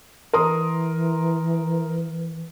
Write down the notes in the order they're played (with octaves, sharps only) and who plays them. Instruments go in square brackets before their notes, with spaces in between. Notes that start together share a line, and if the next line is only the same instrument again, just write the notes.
[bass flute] E3 [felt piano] A#4 C6 D#6